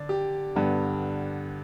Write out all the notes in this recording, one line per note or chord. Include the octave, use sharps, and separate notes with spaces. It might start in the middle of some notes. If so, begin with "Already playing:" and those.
Already playing: D3 D5
G4
G2 D3 G3 B3